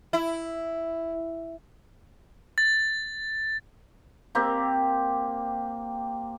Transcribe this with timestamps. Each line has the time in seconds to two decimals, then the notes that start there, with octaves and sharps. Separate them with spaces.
0.13 E4
2.58 A6
4.35 A#3 C4 G4